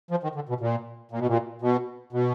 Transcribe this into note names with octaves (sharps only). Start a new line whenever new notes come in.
F3
D#3
D3
B2
A#2
A#2
B2
A#2
B2
B2